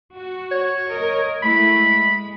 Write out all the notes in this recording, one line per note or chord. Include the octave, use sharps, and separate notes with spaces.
F#4
C#5
A#4 D#5
G#3 A3 E4 B5
G#3